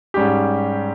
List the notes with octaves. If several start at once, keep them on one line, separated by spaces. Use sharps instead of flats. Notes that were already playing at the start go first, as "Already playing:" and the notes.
G#2 G3 C#4 G4